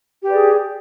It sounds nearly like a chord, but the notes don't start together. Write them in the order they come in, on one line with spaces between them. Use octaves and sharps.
G4 B4 D5 G#4